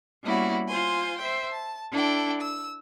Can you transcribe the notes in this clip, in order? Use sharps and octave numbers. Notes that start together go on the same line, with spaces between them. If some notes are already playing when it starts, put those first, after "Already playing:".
G3 A#3 B3 C#4 E4 F#4
F4 C5 G#5 C6
C5 E5 G5
A5
D4 E4 A4 G5
E6